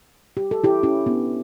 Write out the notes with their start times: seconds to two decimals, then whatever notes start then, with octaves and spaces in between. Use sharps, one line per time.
0.37 G4
0.51 A4
0.64 E4 G4
0.83 C#4 E4
1.06 B3 D4